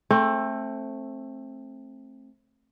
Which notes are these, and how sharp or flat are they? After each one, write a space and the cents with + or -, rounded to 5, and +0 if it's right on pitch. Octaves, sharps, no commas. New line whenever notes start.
A3 +0 C4 +25